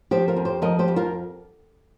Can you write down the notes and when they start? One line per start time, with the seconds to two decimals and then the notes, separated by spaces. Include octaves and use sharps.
0.11 F3 G4 C5
0.28 F4 A#4
0.36 F2
0.45 G4 C5
0.62 F3 A#4 D#5
0.79 G4 C5
0.88 F2
0.96 F4 A#4